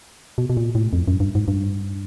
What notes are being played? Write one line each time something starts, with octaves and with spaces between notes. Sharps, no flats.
B2
B2
A#2
A2
F2
F#2
G2
G#2
G2